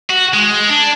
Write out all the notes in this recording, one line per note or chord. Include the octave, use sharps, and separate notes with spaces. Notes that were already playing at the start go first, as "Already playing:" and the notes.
F#4
G#3
D4